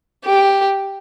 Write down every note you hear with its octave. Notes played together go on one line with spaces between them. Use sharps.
G4